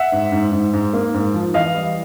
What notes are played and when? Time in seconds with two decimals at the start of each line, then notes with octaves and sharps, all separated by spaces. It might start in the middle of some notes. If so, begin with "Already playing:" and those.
Already playing: E5 F#5
0.12 G#2
0.32 G#2
0.52 G#2
0.73 G#2
0.93 A#3
1.14 G#2
1.34 F3
1.54 E3 D#5 F5
1.74 G3